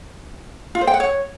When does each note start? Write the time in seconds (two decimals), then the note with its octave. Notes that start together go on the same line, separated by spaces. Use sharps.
0.75 F4
0.81 C5
0.87 G5
0.94 F#5
1.00 C#5